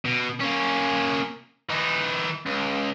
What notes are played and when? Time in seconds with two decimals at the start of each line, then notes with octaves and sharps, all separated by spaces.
0.05 B2
0.40 A#3 C#4
1.69 E3 D#4
2.46 C#2